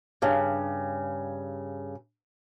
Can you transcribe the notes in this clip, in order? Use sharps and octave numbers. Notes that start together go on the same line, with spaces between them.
G2 C#3